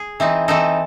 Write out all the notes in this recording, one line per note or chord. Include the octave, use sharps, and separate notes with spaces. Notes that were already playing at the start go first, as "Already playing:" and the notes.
Already playing: G#4
E3 C4 D#4
E3 C4 D#4 A4